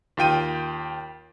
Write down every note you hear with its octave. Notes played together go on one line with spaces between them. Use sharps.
D#2 F4 G5 D#7